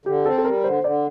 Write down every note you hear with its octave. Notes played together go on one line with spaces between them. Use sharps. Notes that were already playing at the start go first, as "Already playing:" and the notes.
D3 G4
C4 A4
A4
G3 A#4
D3 C5
D3 D5